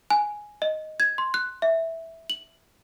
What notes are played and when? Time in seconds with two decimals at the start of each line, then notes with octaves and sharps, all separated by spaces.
0.10 G#5
0.62 D#5
1.00 G#6
1.18 C6
1.34 F#6
1.62 E5
2.30 F#7